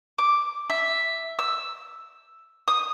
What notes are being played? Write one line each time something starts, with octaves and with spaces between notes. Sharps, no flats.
D6
E5
E6
D#6